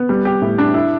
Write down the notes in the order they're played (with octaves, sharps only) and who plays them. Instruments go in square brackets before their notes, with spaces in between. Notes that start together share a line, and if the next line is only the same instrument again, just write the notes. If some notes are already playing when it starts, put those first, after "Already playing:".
Already playing: [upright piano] B3
G3
G4
A2
D4
E4